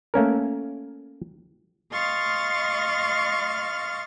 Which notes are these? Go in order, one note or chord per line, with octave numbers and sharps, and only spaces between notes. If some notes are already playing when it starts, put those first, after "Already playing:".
A3 A#3 C#4 A#4
D#5 F5 C6 C#6 F6 A6